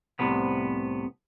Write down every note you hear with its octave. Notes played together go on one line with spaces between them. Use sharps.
C2 A2 C3 B3